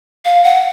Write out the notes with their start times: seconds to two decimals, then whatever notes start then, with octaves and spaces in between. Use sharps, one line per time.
0.25 F5
0.44 F#5